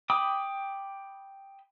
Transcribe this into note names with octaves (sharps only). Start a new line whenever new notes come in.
G5 B5 D6 D#6